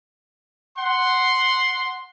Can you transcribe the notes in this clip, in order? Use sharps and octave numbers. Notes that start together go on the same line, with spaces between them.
F#5 C6